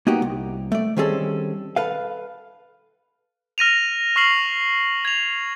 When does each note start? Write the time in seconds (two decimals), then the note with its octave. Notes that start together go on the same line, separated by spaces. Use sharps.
0.07 A#3 B3 D#4 F#4 G4
0.22 C2
0.72 A3 D5
0.97 D#3 G3 C4 C#4 G#4 A4
1.76 A4 B4 F5
3.58 F6 A#6 D#7 F7
4.16 C#6 F6 C7 F#7
5.05 G#6 F7